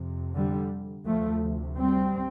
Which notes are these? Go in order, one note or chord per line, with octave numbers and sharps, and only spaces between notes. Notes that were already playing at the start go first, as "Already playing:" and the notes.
Already playing: F2 C3
D3 G3
D2 C3 F3 A3
G3 C4